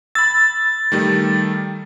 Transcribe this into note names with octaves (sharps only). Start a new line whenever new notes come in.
B5 E6 A6
D#3 G3 A3